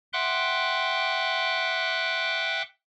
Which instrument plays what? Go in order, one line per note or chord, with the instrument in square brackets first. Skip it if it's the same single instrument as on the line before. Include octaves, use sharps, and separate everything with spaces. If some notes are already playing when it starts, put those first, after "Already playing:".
[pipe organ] E5 F#5 G5 C6 D6 F#6